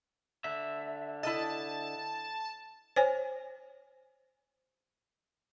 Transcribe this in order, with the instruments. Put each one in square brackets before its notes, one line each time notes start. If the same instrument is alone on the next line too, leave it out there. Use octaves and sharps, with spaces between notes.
[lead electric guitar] D3 E5
[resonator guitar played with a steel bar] E4 A4 D#5 [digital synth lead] A5
[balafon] C5 C#5 G#5